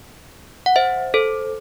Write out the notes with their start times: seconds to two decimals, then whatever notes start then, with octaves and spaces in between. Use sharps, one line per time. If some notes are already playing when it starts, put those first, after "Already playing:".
0.66 F#5
0.76 C5 E5
1.14 A4 C5